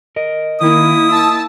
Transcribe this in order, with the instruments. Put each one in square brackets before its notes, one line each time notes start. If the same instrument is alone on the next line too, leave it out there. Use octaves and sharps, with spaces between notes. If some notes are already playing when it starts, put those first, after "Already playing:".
[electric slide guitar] A#4 D#5
[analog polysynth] D#3 [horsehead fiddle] A#3 E4 [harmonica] D#6
[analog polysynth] A5 E6